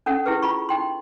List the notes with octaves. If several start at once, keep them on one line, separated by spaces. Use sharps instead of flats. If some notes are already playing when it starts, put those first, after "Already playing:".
C#4 D4 A4 F#5
E4 G4 G#4 B4
F4 B5 C#6
D#4 G5 C6